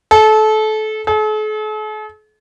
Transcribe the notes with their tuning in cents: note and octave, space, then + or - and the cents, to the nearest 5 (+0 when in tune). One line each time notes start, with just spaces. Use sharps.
A4 -25
A4 -45